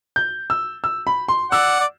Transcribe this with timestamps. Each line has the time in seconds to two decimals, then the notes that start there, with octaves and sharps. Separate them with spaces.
0.16 G6
0.50 E6
0.84 E6
1.07 B5
1.28 C6
1.51 D5 F#5 E6
1.80 D5